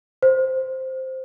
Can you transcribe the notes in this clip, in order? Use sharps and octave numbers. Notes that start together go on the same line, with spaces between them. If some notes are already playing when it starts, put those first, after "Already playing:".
C5